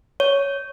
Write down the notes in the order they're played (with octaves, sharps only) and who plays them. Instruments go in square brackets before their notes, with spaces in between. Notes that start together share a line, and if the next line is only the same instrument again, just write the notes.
[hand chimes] C#5